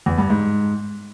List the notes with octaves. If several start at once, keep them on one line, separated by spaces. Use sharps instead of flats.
E2
G2
G#2